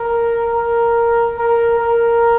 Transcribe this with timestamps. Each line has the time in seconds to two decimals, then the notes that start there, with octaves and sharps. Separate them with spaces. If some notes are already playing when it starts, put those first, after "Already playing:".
Already playing: A#4
0.54 A#4
1.37 A#4
1.79 A#4